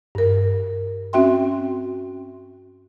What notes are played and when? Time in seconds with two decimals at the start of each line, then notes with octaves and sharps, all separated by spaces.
0.15 G2 A#4
1.13 C4 C#4 F#4 E5 G5 C6